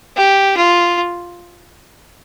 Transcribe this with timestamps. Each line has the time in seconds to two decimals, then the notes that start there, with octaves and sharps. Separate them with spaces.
0.17 G4
0.57 F4